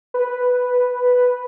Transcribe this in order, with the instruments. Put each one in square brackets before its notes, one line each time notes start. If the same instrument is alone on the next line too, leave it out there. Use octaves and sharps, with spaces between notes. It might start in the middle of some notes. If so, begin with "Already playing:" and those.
[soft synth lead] B4